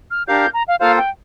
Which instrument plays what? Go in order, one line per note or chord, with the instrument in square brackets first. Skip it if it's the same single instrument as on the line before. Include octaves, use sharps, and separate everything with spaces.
[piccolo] F6
[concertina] D4 G4 A#4 F5 [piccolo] G6
[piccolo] G6
A#5
F5
[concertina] A#3 F4 A4 C5 [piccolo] F5
[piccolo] G5